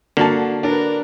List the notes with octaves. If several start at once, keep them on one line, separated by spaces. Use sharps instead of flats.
D3 A#3 F#4 A5
D4 A#4 B4